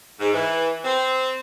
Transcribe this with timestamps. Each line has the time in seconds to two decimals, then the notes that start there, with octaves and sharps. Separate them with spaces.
0.19 G#2
0.33 E3
0.84 C4